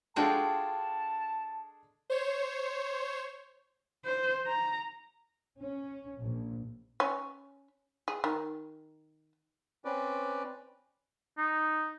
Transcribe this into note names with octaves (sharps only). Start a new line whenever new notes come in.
G#3 D4 F4 F#4 A4 G5 A5
C5 C#5
C5
A#5
C#4
A#1
C#4
G#4
D#3
C4 C#4 B4 D5
D#4